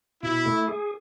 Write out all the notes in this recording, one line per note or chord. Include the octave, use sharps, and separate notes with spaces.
B2 E4
A3
G#4